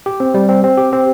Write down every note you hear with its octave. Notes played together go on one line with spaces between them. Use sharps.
G4
C4
G3
C4
C4
G4
C4